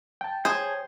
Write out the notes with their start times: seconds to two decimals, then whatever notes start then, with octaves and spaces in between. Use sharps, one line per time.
0.21 G5 A5
0.45 G#4 C5 C#5 G6